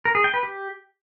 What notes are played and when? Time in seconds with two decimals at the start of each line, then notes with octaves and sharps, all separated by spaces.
0.05 A#4
0.15 G#4
0.24 G5
0.34 B4
0.43 G4